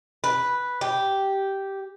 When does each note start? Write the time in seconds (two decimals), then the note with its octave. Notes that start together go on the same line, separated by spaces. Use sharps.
0.24 B4
0.81 G4